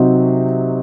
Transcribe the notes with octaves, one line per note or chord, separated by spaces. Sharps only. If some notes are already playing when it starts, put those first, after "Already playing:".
Already playing: C3 F#3 C4 D#4